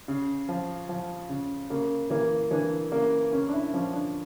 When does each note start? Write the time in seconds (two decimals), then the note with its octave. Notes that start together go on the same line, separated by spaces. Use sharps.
0.08 C#3
0.49 F3
0.89 F3
1.29 C#3
1.70 C#3 A#3
2.10 E3 A#3
2.51 E3 D4
2.92 C#3 A#3
3.33 C#3 C#4
3.49 D4
3.53 E4
3.73 F3 C#4
3.93 D4